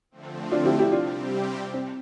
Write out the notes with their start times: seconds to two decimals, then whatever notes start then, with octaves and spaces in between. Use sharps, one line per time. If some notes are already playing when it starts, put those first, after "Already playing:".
0.11 D3 F3 A3 C4
0.51 D4 F4
0.65 E4 G4
0.79 E4 G4
0.92 C3 G3 C4 D4 F4 G4
1.74 C4